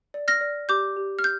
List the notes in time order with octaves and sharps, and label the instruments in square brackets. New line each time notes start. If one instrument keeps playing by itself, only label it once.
[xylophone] D5
F6 A#6
D5
G4 D6 G6
G4
F6
G6